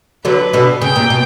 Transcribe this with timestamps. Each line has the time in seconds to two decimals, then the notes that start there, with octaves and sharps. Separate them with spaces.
0.25 D3 F#3 B4
0.53 B2 D3
0.82 C#3 G5
0.96 A#2
1.10 B2